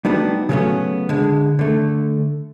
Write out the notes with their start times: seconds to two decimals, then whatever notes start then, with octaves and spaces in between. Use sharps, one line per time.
0.05 G3 A3 B3 D4 D#4 F#4
0.49 C#3 F#3 G3 A3 B3 C#4
1.09 D3 G#3
1.59 D3 A3